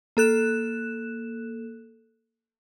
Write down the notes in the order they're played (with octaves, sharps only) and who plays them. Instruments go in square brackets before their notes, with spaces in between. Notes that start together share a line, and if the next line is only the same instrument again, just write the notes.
[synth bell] A#3 A4 F#6 E7